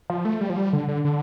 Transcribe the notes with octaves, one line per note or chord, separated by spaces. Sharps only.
F3
A3
G3
F3
G3
D3
D3
D3